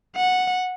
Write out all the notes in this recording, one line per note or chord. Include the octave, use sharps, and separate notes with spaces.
F#5